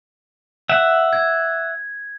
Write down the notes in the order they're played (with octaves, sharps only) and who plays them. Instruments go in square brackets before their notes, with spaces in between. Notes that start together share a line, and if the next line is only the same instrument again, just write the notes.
[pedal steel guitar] E5 F#5
[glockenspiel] G#6